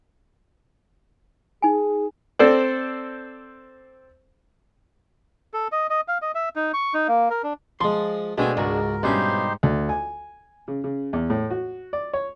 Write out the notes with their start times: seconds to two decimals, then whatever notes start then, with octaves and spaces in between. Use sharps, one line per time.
1.62 D#4 G#4 G#5
2.39 C4 A4 C5 D5
5.54 A4
5.72 D#5
5.90 D#5
6.08 F5
6.22 D#5
6.35 E5
6.56 D#4
6.74 C#6
6.94 D#4
7.08 A#3
7.30 A#4
7.43 D4
7.81 F3 G#3 C6
8.38 B2 G#3 A3 C4 D4 G5 G#5
8.57 C#2 G#2 F#4 A#4
9.03 G2 B2 C#4 D#4 G4 C5 E5 F5
9.63 D2
9.89 G#5
10.68 C#3
10.84 C#3
11.13 E2
11.30 A2
11.50 F#4
11.93 D5
12.13 C#5